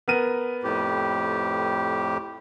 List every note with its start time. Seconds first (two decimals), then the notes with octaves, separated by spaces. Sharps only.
0.08 B3 A#4 D#7
0.64 F2 A2 G4